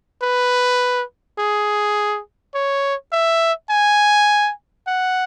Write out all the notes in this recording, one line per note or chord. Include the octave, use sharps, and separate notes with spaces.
B4
G#4
C#5
E5
G#5
F#5